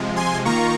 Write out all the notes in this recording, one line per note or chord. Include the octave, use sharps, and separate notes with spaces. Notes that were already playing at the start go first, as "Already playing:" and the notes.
Already playing: C3 F3 G#3
G#5 C6
D#3 A#3 F4 A#5 C#6